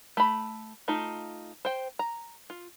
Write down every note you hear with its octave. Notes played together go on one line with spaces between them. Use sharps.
A3 B5
A3 D#4 F4
C5 G5
A#5
F4